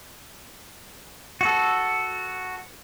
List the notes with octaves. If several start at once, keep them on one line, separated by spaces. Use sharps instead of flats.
F#4 A4